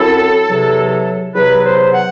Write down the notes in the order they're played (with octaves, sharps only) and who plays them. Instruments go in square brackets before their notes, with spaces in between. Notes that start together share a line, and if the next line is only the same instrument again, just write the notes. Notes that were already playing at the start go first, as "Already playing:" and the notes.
Already playing: [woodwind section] F#2 F#3 C4 E4 A4
E2 C3 F#3
E2 C3 F#3 B4
C5
F#5